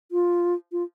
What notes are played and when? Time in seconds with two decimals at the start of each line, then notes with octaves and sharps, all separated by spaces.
0.12 F4
0.72 F4